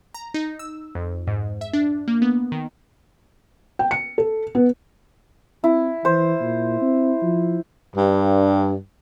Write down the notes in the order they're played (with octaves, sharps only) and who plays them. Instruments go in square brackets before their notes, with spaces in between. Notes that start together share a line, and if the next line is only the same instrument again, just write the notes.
[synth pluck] A#5
D#4
E6
F2
G#2
E5
D4
A#3
B3
D#3
[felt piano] G5
C#7
A4
B3
[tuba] C4 [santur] E4
[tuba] E3 [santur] C5
[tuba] A#2
C4
F3
[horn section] G2